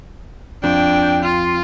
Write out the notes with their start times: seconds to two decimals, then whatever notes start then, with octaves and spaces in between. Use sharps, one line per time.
0.64 F2 D4 G5
1.23 F4